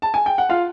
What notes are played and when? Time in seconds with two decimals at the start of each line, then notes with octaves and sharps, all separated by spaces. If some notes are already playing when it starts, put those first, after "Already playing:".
0.02 A5
0.14 G#5
0.26 G5
0.38 F#5
0.49 F4 F5